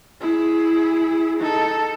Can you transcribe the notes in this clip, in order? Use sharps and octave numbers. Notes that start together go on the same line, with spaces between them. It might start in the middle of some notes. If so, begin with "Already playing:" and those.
E4 G#4
D#4 A4